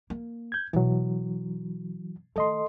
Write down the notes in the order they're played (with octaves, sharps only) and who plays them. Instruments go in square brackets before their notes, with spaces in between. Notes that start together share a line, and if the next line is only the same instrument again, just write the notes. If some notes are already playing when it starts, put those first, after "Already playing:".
[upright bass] A#3
[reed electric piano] G6 G#6
[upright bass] B2 [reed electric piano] E3 F#3
[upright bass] D#3 A3 [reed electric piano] A4 D#5 C6